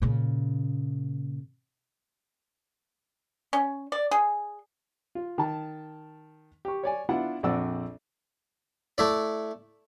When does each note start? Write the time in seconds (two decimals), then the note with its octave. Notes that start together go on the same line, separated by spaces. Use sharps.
0.02 A#2 C#3
3.53 C#4
3.92 D5
4.11 G#4
5.15 F4
5.38 D#3 A5
6.65 G4 C#6
6.83 C#5 D5 G#5
7.09 B3 D4 E4 F4 F#5
7.43 A#1 F2 C4 D5 F#5 E6
8.98 A3 E4 D5